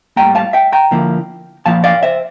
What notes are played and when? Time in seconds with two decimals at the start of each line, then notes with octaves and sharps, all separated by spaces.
0.16 A2 G3 A#3 G5 A#5
0.35 F5 A5
0.53 E5 G5
0.72 G5 A#5
0.91 D3 F3 A#3 E4
1.66 A#2 F3 A#3 E4 F5 A5
1.84 D5 F5
2.03 C5 E5